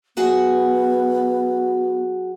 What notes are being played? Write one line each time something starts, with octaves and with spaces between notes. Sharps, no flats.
F#3 B3 F#4 G#4